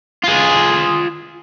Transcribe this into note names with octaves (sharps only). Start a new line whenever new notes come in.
F4 G#4